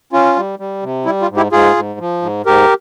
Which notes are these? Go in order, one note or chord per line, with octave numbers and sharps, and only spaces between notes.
C#4 F4
G3
G3
C3
G3 E4
F4
G#2
E4 G4
G#2 F4 G#4
G#2
F3
G#2
G#2 G4 A#4